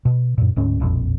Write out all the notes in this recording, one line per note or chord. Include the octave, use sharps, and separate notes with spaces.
B2
F#2 A#2
D1 D2 G#2 C#4
E1 A#1 F2